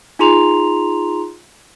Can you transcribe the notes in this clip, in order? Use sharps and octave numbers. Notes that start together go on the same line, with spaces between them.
D#4 F4 G#4 A#5 C6 F7